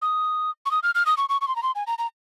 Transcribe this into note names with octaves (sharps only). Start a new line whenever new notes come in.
D#6
C#6
D#6
F6
F6
D#6
C#6
C#6
C#6
C6
A#5
C6
G#5
A#5
A#5